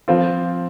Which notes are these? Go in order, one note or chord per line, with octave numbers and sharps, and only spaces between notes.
F3 C4 F4